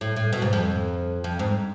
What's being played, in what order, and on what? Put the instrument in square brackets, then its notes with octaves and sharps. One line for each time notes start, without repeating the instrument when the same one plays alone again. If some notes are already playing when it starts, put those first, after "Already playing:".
[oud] A2
A2
B2
G#2
F2
F2
G#2